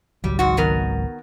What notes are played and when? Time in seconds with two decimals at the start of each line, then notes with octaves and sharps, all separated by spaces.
0.24 G#1 C#2 F#3 G3
0.39 G#2 F#4
0.57 D#3 B3 A#4